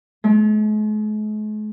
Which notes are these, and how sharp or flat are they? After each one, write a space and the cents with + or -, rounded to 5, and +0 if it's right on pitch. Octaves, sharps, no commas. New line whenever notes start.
G#3 +45